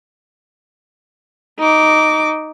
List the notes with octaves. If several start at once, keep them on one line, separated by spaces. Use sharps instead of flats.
D#4 D6